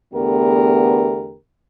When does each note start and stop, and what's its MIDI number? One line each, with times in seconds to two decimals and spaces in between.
0.13 1.34 40
0.13 1.34 50
0.13 1.34 57
0.13 1.34 59
0.13 1.34 67
0.13 1.34 70